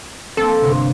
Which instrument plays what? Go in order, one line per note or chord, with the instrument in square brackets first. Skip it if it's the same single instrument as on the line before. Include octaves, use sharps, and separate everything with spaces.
[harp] A#3 C4 [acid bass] A4
[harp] G1 C3